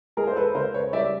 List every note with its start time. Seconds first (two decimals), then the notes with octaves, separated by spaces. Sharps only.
0.17 G#3 G#4 A#4
0.27 C5
0.36 A4 B4
0.55 C#3 A#4 C5
0.74 B4 C#5
0.93 G3 D5 E5